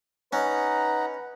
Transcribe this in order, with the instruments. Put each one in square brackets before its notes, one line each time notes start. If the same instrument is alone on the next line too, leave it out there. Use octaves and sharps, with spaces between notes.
[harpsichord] C#4 [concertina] D#4 F#5 A#5 [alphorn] B4